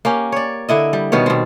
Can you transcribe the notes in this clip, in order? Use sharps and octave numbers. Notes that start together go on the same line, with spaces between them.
A#3 C#4 G4
C#5 D5
D3 E4 D#5
G3
B2 D#3 B3 C#5
B2 C4